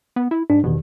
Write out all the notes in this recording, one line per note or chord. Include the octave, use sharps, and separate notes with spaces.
B3
E4
G#2 D4
A1 E2 B2 D#3